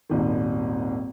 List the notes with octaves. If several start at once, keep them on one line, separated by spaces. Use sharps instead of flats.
D#1 G#1 D#3